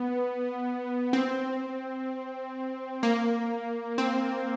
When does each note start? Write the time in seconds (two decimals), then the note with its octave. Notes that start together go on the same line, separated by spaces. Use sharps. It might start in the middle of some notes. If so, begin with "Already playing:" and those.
Already playing: B3
1.13 C4
3.03 A#3
3.98 C4